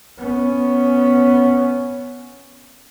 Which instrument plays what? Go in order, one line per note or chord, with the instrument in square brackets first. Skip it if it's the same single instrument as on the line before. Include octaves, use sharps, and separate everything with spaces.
[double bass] B3 C#4